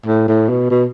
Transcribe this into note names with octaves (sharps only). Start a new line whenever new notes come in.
A2
A2
B2
B2